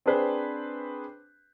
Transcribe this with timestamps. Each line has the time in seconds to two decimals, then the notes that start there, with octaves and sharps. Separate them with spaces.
0.06 C4 D4 G#4 B4 C5